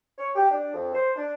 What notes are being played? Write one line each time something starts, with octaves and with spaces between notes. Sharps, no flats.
C#5
G4
D4
F2
C5
D4